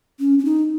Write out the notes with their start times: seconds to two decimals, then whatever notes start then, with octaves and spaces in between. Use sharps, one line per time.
0.20 C#4
0.39 C#4
0.45 D#4